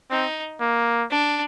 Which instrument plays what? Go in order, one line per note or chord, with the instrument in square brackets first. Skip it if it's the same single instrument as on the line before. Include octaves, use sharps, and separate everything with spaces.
[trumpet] C4 [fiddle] D#4
[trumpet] A#3
[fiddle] D4